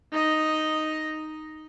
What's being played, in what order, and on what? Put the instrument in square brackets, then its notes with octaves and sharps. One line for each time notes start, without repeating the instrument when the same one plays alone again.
[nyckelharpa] D#4 D#5